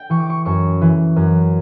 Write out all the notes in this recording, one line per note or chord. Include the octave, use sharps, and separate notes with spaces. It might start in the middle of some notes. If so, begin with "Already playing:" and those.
Already playing: G5
E3 C#6
D6
C#6
F#2 C#6
E3
F#2